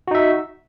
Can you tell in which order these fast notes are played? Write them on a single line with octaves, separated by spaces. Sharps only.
F#4 D#4 E5